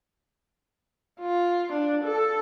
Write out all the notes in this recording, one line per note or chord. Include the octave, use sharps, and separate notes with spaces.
F4
D4
A4